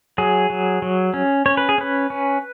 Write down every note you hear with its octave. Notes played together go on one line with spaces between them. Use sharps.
F#3 G#4
F#3
F#3
C#4
C#4 C#5
B4
G#4
C#4 B4
C#4